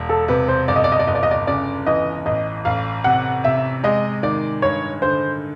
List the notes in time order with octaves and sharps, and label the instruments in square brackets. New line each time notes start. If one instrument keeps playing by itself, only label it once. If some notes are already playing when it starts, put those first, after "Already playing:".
Already playing: [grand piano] E1
[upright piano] A4
[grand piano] C3 [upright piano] B4
[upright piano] C5
[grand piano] G1 [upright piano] D5
[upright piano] D#5
D5
D#5
D5
[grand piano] G1 [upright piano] D#5
[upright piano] D5
D#5
D5
[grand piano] C#3 [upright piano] D5
[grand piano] E3 [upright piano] D#5
[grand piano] A1 [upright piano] D#5
[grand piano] A1 [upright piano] F5
[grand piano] C3 [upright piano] F#5
[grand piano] C3 [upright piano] E5
[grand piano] G#3 [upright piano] D#5
[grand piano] D#3 [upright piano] D5
[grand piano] G2 [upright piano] C#5
[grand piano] D3 [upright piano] C5